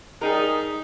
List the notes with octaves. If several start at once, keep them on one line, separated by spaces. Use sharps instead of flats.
G3 D#4 G#4 A#4